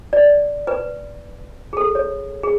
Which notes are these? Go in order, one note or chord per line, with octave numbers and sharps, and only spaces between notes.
D5
B4
G#4
A4
C#5
G#4